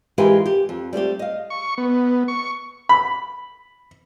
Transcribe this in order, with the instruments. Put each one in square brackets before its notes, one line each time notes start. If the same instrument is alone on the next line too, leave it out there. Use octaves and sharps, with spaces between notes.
[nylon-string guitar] E3 G#3 F4 G4 A#4 E5
G4
F2
G3 A3 C4 G4
D#5 F5
[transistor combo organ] C#6
B3
C#6
[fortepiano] B5